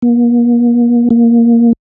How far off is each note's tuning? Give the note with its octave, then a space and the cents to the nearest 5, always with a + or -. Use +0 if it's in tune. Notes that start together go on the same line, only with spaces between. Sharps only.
A#3 +40
A#3 +5